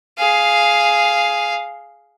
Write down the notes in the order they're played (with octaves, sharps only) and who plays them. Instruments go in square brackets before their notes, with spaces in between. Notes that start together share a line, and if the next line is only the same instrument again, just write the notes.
[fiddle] G#4 F5